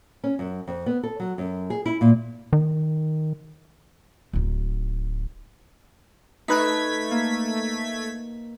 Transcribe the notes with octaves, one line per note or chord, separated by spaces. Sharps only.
C#4
F#2
F2
B3
A4
F#3
F#2
G#4
E4
A#2
D#3
D1 D#4
A3 D#4 B4 F#6 G#6 B6
A#3